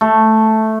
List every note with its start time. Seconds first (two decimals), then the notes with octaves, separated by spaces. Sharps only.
0.01 A3